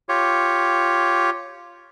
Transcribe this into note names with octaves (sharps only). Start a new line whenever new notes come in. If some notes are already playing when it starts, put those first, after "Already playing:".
F4 G4 C#5